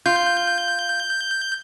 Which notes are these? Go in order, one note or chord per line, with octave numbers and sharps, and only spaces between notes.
F4 G6